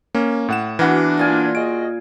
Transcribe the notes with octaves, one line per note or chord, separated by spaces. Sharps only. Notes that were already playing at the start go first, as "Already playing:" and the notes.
A#3 C#4
A2 F#5 E7
E3 B3 D4 F#4 A#4 F#5
A#2 F4 G#5
F#4 G#4 D#5 D7